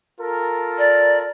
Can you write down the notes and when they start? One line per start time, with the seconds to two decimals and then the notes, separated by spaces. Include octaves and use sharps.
0.20 F4 A4 A#4
0.78 D5